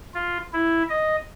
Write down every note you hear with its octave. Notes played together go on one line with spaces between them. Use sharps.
F4
E4
D#5